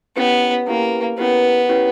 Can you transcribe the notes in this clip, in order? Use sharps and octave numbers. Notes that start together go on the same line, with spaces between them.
B3 C#4 E4 G4 B4
A#3 C#4 E4 G4 B4
B3 C#4 E4 G4 B4
C#4 E4 G4 B4